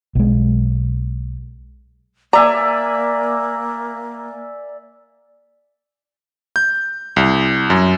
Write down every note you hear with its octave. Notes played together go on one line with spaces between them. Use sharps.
B1 G#3
A#3 D5 E5 G#5 A#5
G6
C2
F#2